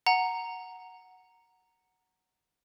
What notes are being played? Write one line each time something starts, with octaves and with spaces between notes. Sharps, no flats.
F#5 A#5